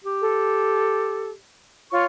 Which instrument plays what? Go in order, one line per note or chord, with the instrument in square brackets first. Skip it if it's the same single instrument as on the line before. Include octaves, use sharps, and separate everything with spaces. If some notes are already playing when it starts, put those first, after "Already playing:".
[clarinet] G4
[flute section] A4
F4 C#5 C#6